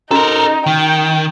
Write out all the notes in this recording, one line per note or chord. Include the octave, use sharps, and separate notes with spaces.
C#4 D#4 F#4 A4 A#4 A#5
D#3 G5